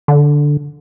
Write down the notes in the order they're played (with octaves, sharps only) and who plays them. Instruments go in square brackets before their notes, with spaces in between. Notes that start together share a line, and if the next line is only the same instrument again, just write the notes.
[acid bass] D3